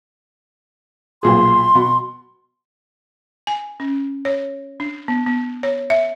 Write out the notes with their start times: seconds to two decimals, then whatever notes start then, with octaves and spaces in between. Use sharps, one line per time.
1.23 B1 A#2 G#4 C6
1.75 B2
3.47 G#5
3.80 C#4
4.25 C#5
4.80 D4
5.08 B3
5.26 B3
5.63 C#5
5.90 E5